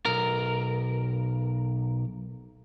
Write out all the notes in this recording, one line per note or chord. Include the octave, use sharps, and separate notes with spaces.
B1 A#4